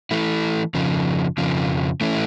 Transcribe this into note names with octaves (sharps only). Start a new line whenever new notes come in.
E3 A3 E4
F2 C#3 F3
F2 C#3 F3
E3 A3 C#4 E4